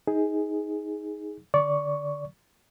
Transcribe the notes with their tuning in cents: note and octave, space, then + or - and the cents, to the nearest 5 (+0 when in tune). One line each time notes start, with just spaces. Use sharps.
D#4 +20 G#4 +0
D3 +0 D5 -20 C#6 +0